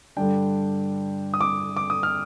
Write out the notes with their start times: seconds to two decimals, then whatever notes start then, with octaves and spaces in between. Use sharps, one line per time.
0.17 G2 D3 G3 D4 G5
1.34 D#6
1.41 D6
1.77 D6
1.90 D#6
2.03 F6